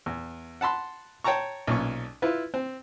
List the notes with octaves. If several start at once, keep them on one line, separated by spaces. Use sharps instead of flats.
E2
F#5 A5 B5 C6
C#5 G5 A5 A#5 C#6
B1 A#2 C#4 C#6
E4 F4 B4
C4